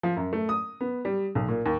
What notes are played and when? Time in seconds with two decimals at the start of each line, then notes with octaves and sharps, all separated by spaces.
0.03 F3
0.17 F#2
0.33 A3
0.49 D#6
0.81 B3
1.05 G3
1.35 B1
1.48 A#2
1.66 D#2